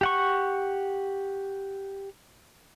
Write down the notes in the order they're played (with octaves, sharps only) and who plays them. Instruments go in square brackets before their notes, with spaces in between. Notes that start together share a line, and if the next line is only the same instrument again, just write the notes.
[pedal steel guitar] G4 F#5 C#6